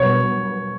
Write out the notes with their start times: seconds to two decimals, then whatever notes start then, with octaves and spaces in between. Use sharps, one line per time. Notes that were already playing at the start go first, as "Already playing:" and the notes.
Already playing: B2 F#3 B3 C#5